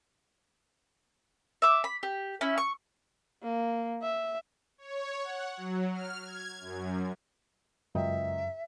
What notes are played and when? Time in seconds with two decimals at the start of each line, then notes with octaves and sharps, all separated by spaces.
1.62 E5 D6
1.84 B5
2.03 G4
2.41 C#4 E4
2.58 C#6
3.43 A#3
4.02 E5
4.78 C#5
5.23 F#5
5.57 F#3
5.93 F6
6.24 G#6
6.60 F#2
7.95 C#2 F#2 D#5 E5 G5